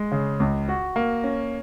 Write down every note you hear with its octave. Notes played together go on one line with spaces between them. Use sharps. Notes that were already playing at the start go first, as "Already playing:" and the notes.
Already playing: G#3
C#3
C#2
F#4
A#3
C#4